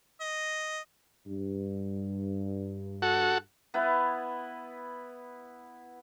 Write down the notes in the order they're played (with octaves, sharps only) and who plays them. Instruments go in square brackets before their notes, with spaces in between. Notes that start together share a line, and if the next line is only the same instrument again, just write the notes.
[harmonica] D#5
[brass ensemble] G2
[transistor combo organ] F#4 A4 F#5
[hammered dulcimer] B3 E4 B4